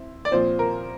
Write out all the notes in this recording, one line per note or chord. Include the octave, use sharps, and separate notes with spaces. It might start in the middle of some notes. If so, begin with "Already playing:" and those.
Already playing: C4 E4
D5
A#2 F3 C4 C5
A#4